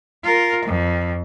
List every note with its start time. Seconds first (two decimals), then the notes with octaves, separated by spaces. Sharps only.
0.24 F4 A#4
0.66 F2